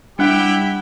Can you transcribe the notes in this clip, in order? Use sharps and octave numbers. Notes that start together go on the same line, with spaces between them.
G3 D4 E4 G4 F#5 G5 F#6 C#7